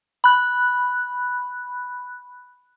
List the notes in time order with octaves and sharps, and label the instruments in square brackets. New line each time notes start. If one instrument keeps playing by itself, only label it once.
[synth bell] B5 F#6